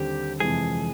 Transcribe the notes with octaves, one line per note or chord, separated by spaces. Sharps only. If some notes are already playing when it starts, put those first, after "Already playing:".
Already playing: D#2 D3 G3 C4 G4
F2 C3 E3 G#3 G#4